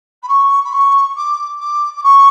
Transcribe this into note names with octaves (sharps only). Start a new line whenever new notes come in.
B5
C#6
B5
C#6
D6
D6
D6
C#6